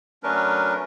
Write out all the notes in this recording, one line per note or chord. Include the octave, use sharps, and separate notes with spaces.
F#3 A3 C#4 D4 A#4 B4